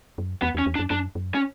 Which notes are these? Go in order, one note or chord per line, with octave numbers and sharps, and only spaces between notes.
F#2
E2 B3
E2
C#4
E2
D4
F#2
F#2 D4
F#2
C#4